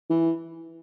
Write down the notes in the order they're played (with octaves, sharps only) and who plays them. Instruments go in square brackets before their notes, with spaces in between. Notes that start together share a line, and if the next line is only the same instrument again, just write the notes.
[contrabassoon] E3